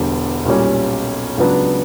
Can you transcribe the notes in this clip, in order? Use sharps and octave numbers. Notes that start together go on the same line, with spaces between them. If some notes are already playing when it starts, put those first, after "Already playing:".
Already playing: E1 E2 D3 G3
B1 A#2 G3 C#4
C#2 C#3 F#3 B3 D4